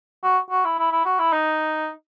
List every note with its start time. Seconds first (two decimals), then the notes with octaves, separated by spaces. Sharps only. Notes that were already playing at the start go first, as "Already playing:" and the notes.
0.24 F#4
0.51 F#4
0.65 E4
0.78 E4
0.92 E4
1.05 F#4
1.19 E4
1.33 D#4